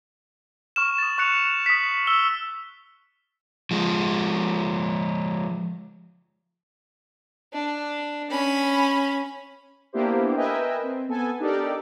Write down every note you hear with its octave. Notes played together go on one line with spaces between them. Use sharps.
C#6 F6 E7
D#6 A6
C#6 F#6 C#7 F7
D#6 B6
E6 G7
F3 G#3
D4
C#4 B5
A#3 B3 D4 E4 G4 C5
A#4 B4 D#5 E5 G5 G#5
C4
B3 A4 G#5
D4 D#4 G4 A4 A#4 D5